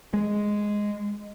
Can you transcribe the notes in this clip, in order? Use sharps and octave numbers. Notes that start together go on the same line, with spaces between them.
G#3